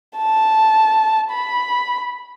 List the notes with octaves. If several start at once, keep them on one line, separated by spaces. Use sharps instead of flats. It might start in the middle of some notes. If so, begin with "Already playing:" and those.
A5
B5